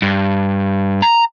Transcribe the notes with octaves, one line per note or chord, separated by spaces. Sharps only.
G2
A#5